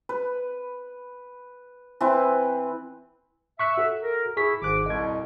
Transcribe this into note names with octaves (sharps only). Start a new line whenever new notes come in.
B4
E3 C4 B4
E5 C#6 F#6 C#7
F#4 A4
A#4
E4 G#4 C#6 B6
G#1 G#2 G#4 D6 F#6
C2 F2 B2 D#5 G#6